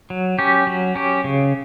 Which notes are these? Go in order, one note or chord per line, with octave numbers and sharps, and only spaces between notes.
F#3
C#4 G4
F#3
C#4 G4
C#3